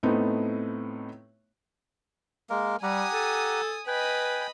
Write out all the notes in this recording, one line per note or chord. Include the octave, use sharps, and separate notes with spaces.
A2 A3 B3 C4 D#4
G#3 A#3 A#4
G3 G4 F#5 G#5 A#5 D#6
A4
B4 D#5 G5 G#5 B5